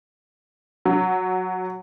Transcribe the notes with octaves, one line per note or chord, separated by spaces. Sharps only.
F#3